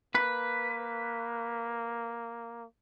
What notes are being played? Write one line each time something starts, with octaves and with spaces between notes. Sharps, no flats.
A#3 B4